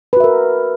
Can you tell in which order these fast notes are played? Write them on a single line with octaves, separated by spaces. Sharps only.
B4 F#4 E5 A#4